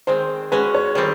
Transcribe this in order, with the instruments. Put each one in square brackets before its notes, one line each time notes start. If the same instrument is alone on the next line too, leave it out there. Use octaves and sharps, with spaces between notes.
[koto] D#3 G#3 C4 [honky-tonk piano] C5
[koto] G#3 C#4 F#4 [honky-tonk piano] B4
[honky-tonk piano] C#5
[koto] D#3 G3 C4